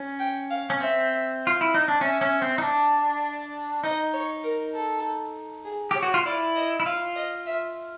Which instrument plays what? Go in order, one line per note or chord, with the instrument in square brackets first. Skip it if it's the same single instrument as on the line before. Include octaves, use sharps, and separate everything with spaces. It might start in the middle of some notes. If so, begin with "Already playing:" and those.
Already playing: [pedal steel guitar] C#4
[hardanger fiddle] G5
F5
[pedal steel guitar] C#4
[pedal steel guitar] C4 [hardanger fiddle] E5
[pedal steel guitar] F4
E4
D#4
D4
[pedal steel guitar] C#4 [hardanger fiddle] E5
[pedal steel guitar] C#4
C4
D#4
D4
[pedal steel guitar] D#4 [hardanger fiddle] D#5
[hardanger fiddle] C#5
A#4
A4
G#4
[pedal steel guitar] G4 [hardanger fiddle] C#5
[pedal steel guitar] F#4
F4
[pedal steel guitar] E4 [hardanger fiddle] D5
[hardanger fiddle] D#5
[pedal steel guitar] E4
[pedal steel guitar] F4 [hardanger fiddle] F5
[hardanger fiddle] D#5
E5